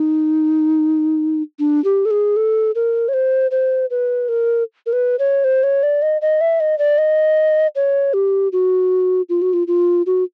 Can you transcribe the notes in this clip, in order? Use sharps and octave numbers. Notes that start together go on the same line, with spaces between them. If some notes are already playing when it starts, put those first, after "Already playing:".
Already playing: D#4
D4
G4
A4
G#4
A4
A#4
C#5
C5
C5
B4
A#4
A#4
B4
C#5
C5
C#5
D5
D#5
D#5
E5
D#5
D5
D#5
C#5
G4
F#4
F4
F#4
F4
F4
F#4